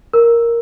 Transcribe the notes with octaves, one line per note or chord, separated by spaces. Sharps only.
A#4